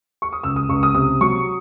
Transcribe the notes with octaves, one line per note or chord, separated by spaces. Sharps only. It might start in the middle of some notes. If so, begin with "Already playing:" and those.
C#6
D#6
C#2 E6
D#6
C#2 C#6
D#6
C3 D#6
F#3 C#6